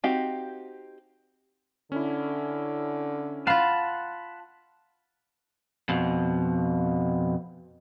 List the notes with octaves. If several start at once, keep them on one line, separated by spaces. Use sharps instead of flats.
C4 D#4 F#4 G4 F5
D3 C#4 E4
F4 F5 F#5 A5 B5
F2 B2